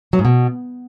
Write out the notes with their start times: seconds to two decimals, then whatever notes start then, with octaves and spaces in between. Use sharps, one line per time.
0.13 F#3
0.19 G#2
0.25 B2